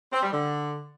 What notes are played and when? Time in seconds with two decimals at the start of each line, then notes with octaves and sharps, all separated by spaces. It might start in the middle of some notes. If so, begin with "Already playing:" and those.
0.13 C4
0.23 G3
0.33 D3